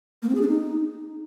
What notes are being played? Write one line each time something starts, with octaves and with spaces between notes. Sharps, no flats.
A#3
C4
G#4
D4
D#4